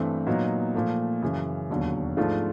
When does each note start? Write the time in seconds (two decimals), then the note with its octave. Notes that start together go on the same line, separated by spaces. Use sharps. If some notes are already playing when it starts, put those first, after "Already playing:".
Already playing: G2 E3 A3 C4
0.27 A#2 F#3 B3 D#4
0.75 A#2 F3 A3
1.22 F#2 C#3 E3
1.70 E1 D#2 D3 F#3
2.17 G#2 F3 A3 D4 F4